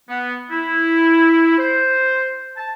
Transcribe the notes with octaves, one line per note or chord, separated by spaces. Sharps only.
B3
E4
C5
A5